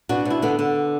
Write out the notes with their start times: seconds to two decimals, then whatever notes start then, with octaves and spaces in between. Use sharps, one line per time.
0.09 B2 D4 F#4
0.25 B2 E4
0.42 D3 B3 D4
0.59 D3